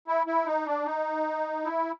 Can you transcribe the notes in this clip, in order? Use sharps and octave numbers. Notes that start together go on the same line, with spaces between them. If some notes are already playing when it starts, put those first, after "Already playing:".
E4
E4
D#4
D4
D#4
E4